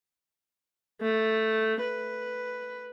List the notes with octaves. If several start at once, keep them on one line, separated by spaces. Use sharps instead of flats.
A3
B4